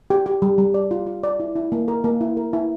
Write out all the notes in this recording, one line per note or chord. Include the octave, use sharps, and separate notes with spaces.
G4
G4
G3
G3
D5
F4
F4
D5
E4
E4
A#3
A#4
A#3
E4
A#4
E4